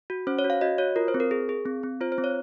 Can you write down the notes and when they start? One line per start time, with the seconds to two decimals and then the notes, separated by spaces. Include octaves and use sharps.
0.10 F#4
0.27 C#4 C5
0.39 C#5
0.44 F#4
0.50 F5
0.61 F#4 D#5
0.78 F#4 C#5
0.96 F4 A#4
1.08 C5
1.14 C4
1.20 A#4
1.31 G#4
1.49 G#4
1.66 C4
1.83 C4
2.01 F4 C5
2.12 C5
2.18 C4
2.24 C#5